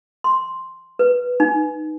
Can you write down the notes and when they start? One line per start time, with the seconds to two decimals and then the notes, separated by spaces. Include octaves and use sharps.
0.24 C6
0.99 B4
1.40 D#4